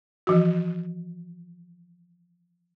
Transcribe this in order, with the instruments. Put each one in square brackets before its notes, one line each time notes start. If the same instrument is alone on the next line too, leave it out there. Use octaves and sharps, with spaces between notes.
[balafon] E3 F3 F#4